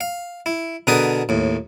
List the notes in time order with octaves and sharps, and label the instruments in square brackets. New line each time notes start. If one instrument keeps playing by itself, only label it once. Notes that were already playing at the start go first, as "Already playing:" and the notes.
[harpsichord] F5
E4
B2 D3 G#4 A#4 B4 D#6
D#2 A2